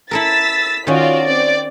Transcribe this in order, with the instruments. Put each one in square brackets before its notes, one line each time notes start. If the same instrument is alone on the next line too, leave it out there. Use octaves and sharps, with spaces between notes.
[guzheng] E4 A4 A#4 [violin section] E6 A6 B6
[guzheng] D#3 C#4 [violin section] F4 F#4 D5
[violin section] C4 D5